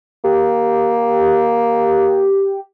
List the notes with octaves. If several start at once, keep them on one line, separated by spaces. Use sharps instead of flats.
A#3 G4